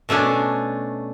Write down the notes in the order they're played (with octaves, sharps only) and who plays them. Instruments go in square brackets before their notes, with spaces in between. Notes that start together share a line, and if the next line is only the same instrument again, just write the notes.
[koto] B2 A3 C#4 D4